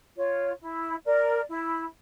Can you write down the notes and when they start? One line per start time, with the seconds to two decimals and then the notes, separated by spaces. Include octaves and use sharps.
0.15 F4 C#5
0.60 E4
1.05 A#4 D5
1.49 E4